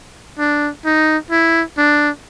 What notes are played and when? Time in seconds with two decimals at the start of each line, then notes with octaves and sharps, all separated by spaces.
0.39 D4
0.85 D#4
1.31 E4
1.77 D4